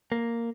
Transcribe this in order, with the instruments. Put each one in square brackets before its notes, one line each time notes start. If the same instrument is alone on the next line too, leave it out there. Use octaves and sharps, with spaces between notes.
[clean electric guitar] A#3